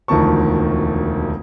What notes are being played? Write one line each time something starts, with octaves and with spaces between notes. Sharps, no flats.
E1 D2 D#3 F3 A5 C#6